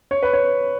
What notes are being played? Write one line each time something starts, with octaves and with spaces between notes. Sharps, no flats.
C#5
B4
C#5